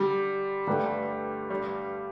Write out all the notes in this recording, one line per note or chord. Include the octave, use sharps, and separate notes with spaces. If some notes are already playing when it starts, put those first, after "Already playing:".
Already playing: D3 G3
G2 D3 A3 G4 B4
G3